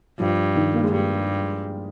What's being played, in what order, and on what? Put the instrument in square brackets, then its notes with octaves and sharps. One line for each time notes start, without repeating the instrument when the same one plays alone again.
[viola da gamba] G2 [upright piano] F3
[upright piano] D#3
A#3
G#3
[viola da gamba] G2 [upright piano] G3